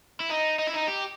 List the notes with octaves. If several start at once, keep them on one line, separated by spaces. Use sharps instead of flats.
E4
D#4
D#4
E4
D#4
G4